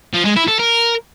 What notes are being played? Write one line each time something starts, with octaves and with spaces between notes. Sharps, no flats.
F3
G#3
E4
A4
A#4